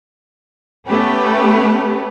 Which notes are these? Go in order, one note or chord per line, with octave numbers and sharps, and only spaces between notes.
A3 B3 C#4 G4 B4